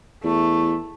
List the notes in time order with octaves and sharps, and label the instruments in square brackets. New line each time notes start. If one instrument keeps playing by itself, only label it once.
[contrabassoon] E2 [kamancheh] A3